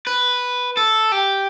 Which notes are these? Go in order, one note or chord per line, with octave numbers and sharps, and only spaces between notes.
B4
A4
G4